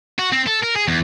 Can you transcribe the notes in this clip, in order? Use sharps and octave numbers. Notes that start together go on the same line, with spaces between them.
F#4
C4
A4
A#4
G#4
E2